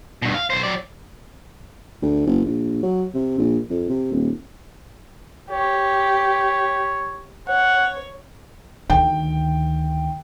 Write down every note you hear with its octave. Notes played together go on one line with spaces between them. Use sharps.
G2 B2
F5
B1 C5
F#3 D5
D2
F#1
A#1
F#3
C3
A#1
F2
C3
D#1
G4 C#5
C#5 F#5
D2 D#3 G5